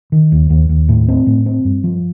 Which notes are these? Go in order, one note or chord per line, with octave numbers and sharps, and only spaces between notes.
D#3
D#2
D#2
D#2
A2
C4
A2
C4
G2
F3